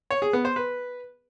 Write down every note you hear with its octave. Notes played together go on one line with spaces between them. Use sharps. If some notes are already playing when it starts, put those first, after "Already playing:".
C#5
G#4
B3
C5
B4